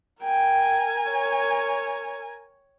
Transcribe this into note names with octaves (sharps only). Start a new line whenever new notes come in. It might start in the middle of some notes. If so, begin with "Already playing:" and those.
A#4 G5 G#5
C#5